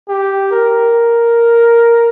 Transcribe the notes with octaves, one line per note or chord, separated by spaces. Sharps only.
G4
A#4